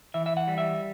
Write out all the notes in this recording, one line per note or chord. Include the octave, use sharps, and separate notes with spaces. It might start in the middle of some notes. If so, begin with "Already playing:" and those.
E3 E5
E5
F#5
G3
E5